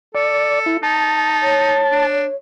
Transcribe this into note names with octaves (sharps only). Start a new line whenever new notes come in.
A4 D5
E4
D#4 A5
C#5
D4